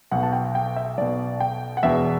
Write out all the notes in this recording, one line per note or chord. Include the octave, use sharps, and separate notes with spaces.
B1 B2 F#5
A5
G5
G5
E5
B1 B2 D5
G5
F#5
E1 E2 B2 E5